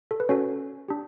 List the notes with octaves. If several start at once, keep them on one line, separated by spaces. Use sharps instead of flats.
A4
B4
C#4 F#4 A4 C#5
D4 G4